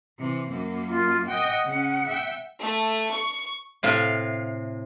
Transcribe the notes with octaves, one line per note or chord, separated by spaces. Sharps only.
C3 E3
F#2 A#3
F4
D#5 F#5 G5
C#3 C#4
E5 G5
A3
C#6
A2 C3 F5